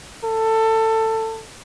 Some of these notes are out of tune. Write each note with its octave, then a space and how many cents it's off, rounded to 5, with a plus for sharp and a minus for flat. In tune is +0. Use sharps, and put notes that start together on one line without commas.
A4 +20